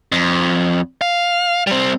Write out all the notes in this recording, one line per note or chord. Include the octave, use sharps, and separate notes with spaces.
F2
F5
G3 C4